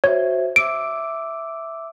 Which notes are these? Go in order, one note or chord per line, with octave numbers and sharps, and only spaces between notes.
F#4 C5 C#5 E5
E5 D6 E6 D7